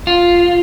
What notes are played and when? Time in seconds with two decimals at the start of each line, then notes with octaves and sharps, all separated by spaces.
0.07 F4